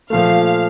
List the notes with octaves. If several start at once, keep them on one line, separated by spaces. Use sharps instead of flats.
A#2 F3 A3 F5